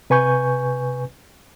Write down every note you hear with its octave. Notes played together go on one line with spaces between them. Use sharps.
C3 B4 G#5 C#6 G6